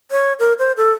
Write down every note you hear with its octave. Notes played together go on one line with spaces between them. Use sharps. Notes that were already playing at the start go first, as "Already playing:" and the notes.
C#5
A#4
C5
A4